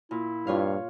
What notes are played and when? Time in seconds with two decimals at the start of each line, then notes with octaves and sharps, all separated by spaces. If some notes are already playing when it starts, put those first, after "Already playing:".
0.11 A#2 E4
0.47 G2 F4 C#5 F5